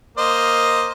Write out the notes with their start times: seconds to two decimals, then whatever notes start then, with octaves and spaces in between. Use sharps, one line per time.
0.18 A#3 C5 D#5